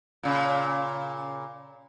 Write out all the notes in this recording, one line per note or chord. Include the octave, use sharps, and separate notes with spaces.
A#2 C#3